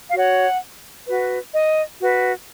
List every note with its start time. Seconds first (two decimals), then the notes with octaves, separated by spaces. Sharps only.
0.08 F5
0.14 F#4 C#5 F#5
1.06 F#4 B4
1.53 D#5
2.00 F#4 B4